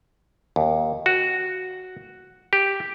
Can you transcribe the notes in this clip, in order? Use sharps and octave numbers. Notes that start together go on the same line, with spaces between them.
D#2
F#4
G4